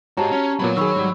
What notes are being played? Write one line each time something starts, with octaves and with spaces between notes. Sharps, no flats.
G#2 F#4 G4 C#5 A5 A#5
C#4
A#2 F#3 B3 C#5 B5
D#3 G#4 B5 C#6 E6
G#2 G3